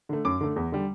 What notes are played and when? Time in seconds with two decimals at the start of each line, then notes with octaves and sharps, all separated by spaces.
0.09 D3 A3
0.25 F#2 D6
0.41 D3 A3
0.56 E2
0.72 D3 G3